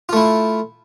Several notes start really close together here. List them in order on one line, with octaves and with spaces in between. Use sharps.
F4 A3 E4